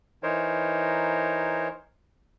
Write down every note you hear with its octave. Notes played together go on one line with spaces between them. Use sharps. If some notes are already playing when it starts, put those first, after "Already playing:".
E3 D#4 A#4 C5 C#5